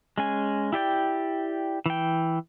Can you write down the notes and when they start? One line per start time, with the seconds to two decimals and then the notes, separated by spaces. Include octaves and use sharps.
0.18 G#3 C#4 G#5
0.73 E4 G4 D5 G5
1.86 E3 G5